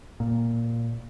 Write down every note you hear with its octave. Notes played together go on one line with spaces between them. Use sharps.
A#2